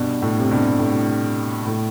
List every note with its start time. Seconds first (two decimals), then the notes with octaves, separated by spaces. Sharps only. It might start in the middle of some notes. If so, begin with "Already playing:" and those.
Already playing: G2 B2
0.22 A2
0.40 C3
0.51 G2 B2
0.79 A2
1.67 A2